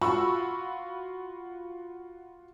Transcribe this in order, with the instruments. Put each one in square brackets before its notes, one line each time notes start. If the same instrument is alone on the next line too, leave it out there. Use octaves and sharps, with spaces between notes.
[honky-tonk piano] F4 F#4 B5 C#6 E6